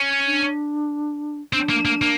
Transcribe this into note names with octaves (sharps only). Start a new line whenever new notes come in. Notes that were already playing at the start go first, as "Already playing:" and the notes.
Already playing: C#4
D4
C4 D4
A#3
A#3
A#3